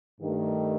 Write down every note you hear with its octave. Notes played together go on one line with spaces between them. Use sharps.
G2 D#3 A3